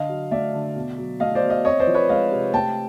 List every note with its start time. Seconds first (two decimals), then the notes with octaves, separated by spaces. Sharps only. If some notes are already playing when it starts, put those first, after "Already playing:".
Already playing: D3 D#5 F5
0.09 F#3
0.31 A3 D5 E5
0.53 D3
0.76 B2
0.98 F#3
1.20 A3 D#5 F5
1.35 C5 D5
1.43 B2
1.50 D#5 F5
1.65 C4 C#5 D#5
1.80 C5 D5
1.87 F3
1.94 B4 C#5
2.09 G#3 D#5 F5
2.32 C3
2.54 A3 G5 A5